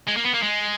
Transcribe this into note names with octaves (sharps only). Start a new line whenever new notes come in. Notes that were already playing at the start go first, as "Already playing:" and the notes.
G#3
A#3
B3
A#3
G#3